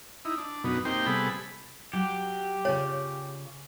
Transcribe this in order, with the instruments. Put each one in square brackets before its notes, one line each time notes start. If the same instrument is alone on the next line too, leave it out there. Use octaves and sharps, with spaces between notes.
[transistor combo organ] D#4 E4
D4
F#2 B2 B3 D#4
A#3 C4 D#4 G4 C5 G5
C3 G3 B3 G#4 A4 B5
[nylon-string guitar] F#3 [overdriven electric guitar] G4
[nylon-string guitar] C#3 F4 D5 [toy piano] C#5